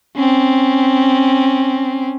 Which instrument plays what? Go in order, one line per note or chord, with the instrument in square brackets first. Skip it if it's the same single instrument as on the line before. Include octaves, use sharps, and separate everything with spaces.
[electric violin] C4 C#4